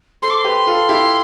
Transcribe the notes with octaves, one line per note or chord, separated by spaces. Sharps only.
A4 C5 C6
D6
C6
G4 B4
F4 A4
E4 G4